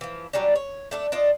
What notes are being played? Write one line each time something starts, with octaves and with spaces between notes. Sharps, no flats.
E3 F3
F#3 G3 C#4 D4
C#5
A3 D4 A4
D4 F4 D#5